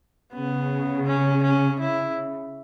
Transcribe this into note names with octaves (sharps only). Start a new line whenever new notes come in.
C#3 B3
C#4
C#4
E4